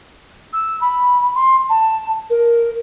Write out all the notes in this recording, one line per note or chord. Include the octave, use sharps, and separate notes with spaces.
E6
B5
C6
A5
A#4